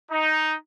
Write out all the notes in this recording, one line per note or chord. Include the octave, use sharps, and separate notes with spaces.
D#4